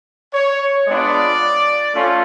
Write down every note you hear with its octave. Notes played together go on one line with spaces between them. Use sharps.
C#5
G#3 B3 D4 F4 D5
A3 C#4 F4